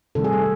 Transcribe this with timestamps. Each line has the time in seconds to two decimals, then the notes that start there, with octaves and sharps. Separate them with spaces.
0.15 C3 D#3 G3 A4
0.24 G#4
0.33 A4